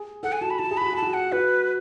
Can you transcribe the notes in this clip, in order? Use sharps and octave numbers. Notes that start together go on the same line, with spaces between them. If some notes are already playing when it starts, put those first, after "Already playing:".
Already playing: G#4
A4 F#5
G#5
F#4 A5
B5
F#4 A5
G#4
F#4 B5
G#4 A5
F#4
F#5
F#4 B4